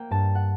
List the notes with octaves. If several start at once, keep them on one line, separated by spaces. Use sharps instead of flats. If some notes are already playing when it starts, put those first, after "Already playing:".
Already playing: A#3 G5
G2 A5
F#5